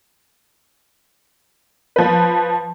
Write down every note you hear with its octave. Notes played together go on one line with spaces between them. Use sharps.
F3 B4